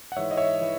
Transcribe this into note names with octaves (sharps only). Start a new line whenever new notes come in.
F#5
G#2 E3 C#5 E5
D#5
C#5 E5
E3